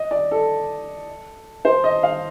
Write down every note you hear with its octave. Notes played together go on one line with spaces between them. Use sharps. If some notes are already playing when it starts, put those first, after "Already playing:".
Already playing: D#5
D5
A4
C5
D#5
F5